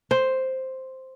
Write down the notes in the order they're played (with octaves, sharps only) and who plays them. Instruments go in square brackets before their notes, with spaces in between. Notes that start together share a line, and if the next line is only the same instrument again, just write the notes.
[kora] C5